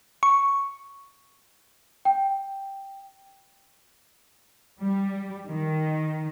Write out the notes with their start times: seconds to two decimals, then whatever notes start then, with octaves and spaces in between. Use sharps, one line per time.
0.23 C#6
2.05 G5
4.80 G3
5.46 D#3